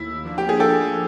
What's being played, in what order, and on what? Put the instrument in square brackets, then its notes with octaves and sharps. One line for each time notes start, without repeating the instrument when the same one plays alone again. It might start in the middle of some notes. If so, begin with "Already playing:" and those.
Already playing: [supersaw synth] D#2 [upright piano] E4
[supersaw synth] F3 A#3 D4
[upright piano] G4
G#4
G4 A4